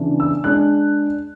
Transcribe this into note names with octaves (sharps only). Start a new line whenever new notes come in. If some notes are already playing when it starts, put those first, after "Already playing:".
Already playing: C#3 E3 B3 D4
E6
G#3 D4 F#6